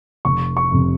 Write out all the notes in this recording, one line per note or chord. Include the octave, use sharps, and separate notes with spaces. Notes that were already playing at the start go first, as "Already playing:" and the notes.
F1 C#6
C#6
F2 C3